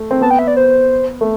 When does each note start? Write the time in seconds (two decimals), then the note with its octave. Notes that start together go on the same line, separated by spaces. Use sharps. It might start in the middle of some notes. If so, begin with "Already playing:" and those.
Already playing: A3
0.11 C4
0.21 B3 A5
0.31 G5
0.39 E5
0.48 D5
0.56 C5
1.21 A3